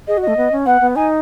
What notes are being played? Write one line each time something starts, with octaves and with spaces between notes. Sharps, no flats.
G#4 D#5
F#4
D#5
A3
B3
C#4
B3 F#5
B3
D#4 G#5